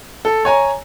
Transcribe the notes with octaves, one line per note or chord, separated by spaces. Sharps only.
A4
C#5 G#5 A#5